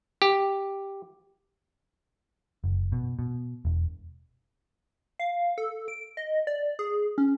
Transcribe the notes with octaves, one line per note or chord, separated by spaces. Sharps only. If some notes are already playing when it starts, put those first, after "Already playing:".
G4
F#1
B2
B2
E1
F5
A4
D7
D#5
D5
G#4
C#4